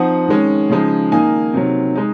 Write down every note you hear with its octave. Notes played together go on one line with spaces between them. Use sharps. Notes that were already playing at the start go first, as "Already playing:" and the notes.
Already playing: F3 C4 D#4 F#5
D#3 G#3 C#4
C#3 F3 G#3 D#4
D#3 A#3 D#4 G#5
C3 D#3 F#3
G#3 D#4